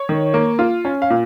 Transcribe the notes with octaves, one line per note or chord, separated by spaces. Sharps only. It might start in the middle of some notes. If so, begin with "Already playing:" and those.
Already playing: C#5
D#3
A#3
F4
C#4
F5
A#2